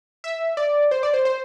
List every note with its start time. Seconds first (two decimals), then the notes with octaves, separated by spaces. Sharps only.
0.24 E5
0.57 D5
0.91 C5
1.03 D5
1.14 C5
1.25 C5